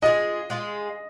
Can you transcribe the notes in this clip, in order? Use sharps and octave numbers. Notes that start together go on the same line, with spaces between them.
G#3 F4 G#4 D#5
G#3 F4 G#4